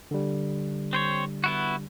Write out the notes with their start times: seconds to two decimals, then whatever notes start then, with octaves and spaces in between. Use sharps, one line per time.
0.11 D3 G3
0.93 C4 C5 C#5
1.44 B3 E4 F#4